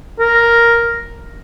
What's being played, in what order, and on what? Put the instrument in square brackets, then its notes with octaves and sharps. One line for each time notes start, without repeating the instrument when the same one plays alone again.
[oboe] A#4